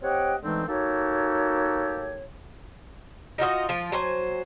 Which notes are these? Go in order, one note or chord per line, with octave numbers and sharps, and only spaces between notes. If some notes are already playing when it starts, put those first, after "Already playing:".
C4 G4 C#5 D#5 F#5 G5
D3 E3 G#3 A3 C4 D#4
A#3 D#4 F#4 G4 A4 C#5
D#4 F4 F#4 D#5
F3 F4
F#3 C5 G#5